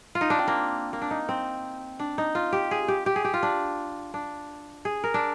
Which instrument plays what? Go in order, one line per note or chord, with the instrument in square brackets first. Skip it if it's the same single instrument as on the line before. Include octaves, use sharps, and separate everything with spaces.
[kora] F4
D#4
D4
C4
A#3
A#3
D4
D#4
C4
D4
D#4
F4
G4
G#4
G4
G4
G#4
G4
F4
D4
D4
G#4
A#4
D4